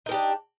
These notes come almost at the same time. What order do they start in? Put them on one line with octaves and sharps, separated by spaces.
D#4 A#4 G4 D4